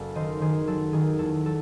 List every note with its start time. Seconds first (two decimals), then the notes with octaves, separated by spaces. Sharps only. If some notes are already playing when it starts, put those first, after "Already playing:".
Already playing: F#1 A4
0.15 D#3 C5 D#5
0.41 D#3 G#4 C5
0.67 F#3 A4
0.93 D#3 G#4
1.19 E2 A4
1.46 F#3 A4